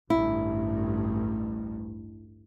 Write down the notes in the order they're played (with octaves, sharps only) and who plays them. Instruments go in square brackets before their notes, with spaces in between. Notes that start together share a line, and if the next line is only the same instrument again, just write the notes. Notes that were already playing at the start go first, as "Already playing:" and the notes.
[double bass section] A1 D2 G2 [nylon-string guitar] E4